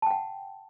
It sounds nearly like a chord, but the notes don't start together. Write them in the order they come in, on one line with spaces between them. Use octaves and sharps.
A5 G5 F#5